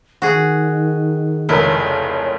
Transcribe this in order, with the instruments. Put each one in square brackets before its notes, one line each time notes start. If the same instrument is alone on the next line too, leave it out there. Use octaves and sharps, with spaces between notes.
[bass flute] D#3 [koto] F#4 G#4
[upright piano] F1 C#2 A#4 [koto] E4 [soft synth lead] C#5